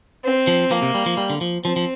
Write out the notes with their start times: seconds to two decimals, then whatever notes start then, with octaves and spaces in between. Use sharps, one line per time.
0.24 C4
0.47 F3
0.71 F3 A#3
0.82 C3
0.95 G3
1.06 F3
1.17 G3
1.30 D3
1.41 F3
1.65 F3 C4
1.76 F3